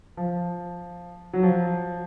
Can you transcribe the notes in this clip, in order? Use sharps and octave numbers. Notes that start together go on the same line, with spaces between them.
F3
F#3
F3